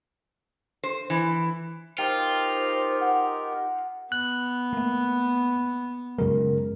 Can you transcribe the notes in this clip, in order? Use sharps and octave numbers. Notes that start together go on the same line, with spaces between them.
C5
E3
D#4 F4 G4 A#4 C5 G5
F#5
B3 F#6
A3 A#3
F#2 C#3 F#3 G#3 A#4